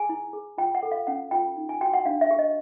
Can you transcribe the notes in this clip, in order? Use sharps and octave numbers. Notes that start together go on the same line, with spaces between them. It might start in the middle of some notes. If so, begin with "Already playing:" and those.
Already playing: G#4 G#5
E4
G#4
F4 G5
F#5
A4
F5
C#4 F#5
F4 G5
D#4
G#5
F#4 G5
F#5
D4 F5
E5
G4
D#5